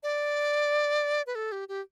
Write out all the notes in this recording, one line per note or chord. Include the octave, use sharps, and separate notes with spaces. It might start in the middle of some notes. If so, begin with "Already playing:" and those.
D5
B4
A4
G4
G4